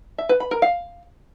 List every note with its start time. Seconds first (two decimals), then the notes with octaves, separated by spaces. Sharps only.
0.18 E5
0.29 B4
0.40 B5
0.51 A#4
0.62 F5